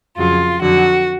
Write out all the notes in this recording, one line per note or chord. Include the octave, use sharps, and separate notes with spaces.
F2 C#3 F#3 F4
F2 D3 F#3 F#4